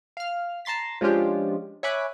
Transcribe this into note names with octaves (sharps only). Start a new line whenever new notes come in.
F5 F6
A5 A#5 C6 A6 B6
F3 G#3 C#4 D4 F4 G4
C#5 E5 G#5 B5 D6 F#6